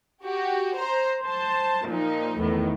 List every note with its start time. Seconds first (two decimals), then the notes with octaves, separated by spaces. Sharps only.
0.23 F#4 G4
0.76 C5 A#5
1.24 C5 A5
1.86 A#2 F3 D#4
2.38 E2 A2 D#3 B3